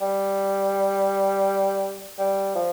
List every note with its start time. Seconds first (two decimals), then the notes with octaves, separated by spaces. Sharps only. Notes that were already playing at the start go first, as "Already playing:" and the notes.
0.01 G3
2.19 G3
2.55 F3